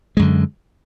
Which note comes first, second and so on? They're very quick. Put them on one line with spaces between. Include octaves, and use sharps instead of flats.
G#3 F#2 D3